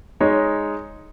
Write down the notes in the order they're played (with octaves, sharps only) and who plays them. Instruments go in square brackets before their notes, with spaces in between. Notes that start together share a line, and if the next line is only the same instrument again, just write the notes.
[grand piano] G#3 D#4 C#5